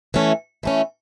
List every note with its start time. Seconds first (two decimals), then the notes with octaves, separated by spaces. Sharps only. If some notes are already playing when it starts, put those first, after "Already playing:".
0.14 E3 A3 C#4
0.63 E3 A3 C#4